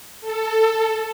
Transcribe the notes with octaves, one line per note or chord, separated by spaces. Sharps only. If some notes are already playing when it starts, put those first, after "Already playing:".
A4